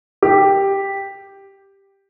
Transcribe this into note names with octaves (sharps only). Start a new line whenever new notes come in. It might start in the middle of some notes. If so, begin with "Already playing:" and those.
G4